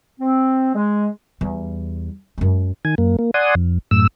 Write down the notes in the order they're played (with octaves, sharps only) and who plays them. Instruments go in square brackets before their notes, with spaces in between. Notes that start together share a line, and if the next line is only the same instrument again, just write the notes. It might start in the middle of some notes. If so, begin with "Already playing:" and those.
[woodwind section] C4
G#3
[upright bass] E2 G3
F#2 G#3
[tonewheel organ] D#3 G#5
F#2 A#3
A#3
D5 F#5 G#5 C6 D#6
F2
F#2 A2 E6